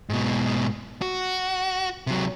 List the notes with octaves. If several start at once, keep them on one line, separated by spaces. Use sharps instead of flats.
G#2 B2
F#4
C3 F#3